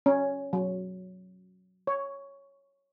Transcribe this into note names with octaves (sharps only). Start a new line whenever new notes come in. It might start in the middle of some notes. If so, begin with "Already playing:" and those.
C#4
F#3
C#5